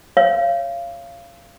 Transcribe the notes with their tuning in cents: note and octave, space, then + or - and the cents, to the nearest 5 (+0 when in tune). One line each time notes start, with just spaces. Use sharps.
C#5 +0 F5 -25